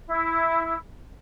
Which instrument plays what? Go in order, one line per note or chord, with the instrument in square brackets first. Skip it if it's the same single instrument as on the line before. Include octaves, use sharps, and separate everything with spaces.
[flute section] E4